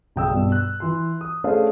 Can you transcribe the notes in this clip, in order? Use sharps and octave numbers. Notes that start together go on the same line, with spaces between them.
B1 C#3 G5 D#6 E6
G2 B2
F#6
E3 C6
D#6
A3 C#4 D4 G#4 C5 F5